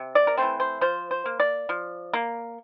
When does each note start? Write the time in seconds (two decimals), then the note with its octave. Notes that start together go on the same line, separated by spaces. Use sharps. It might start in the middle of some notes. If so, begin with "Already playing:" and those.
Already playing: C3
0.15 D5
0.27 A#4
0.37 E3 A3 C4 C5
0.60 C5
0.81 F3 C5
1.11 C5
1.26 A#3
1.40 D5
1.69 F3
2.13 A#3